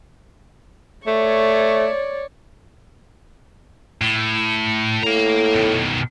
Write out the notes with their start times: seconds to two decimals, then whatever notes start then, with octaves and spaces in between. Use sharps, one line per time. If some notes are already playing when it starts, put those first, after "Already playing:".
1.07 A3 C#5 D5
4.02 A2
5.03 A2 A#3 A#5
5.55 B2 D#3